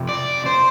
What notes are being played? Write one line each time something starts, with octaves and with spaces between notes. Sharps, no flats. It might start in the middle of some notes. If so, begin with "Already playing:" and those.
Already playing: F2 C3
D5
C5